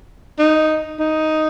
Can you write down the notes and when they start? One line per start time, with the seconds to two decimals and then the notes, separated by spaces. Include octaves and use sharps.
0.39 D#4
0.99 D#4